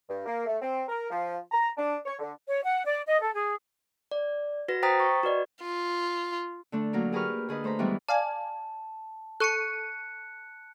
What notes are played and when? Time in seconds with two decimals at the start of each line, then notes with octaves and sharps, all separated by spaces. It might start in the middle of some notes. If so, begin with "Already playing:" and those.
0.09 G2
0.26 A#3
0.46 A3
0.61 C4
0.88 A#4
1.10 F3
1.51 A#5
1.78 D4
2.05 C#5
2.19 D3
2.47 C#5
2.64 F#5
2.86 D5
3.06 D#5
3.21 A4
3.34 G#4
4.11 D5
4.68 F#4 B4 A#6
4.83 C5 G5 A#5 D#6 A6 B6
5.00 C#6
5.23 F#4 B4 D5 D#5
5.63 F4
6.72 D3 A3 D4
6.93 F#3 A#3 A#4
7.12 G4 G#4 A#4 B4 C#6 F6
7.49 D3 G#4 B4 D#5
7.64 A3 C5 A#5 B5
7.79 D#3 E3 G3 G#3 B3 E4
8.09 D5 F5 G#5 A5
9.40 A4 C#6 F#6 C#7 D#7